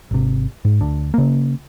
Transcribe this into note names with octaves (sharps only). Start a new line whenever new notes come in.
G#1 C3
G#2
D2 D4
C#3 A#3